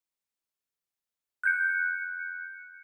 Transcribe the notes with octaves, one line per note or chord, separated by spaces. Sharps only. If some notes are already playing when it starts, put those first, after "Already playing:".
F#6 G6 C#7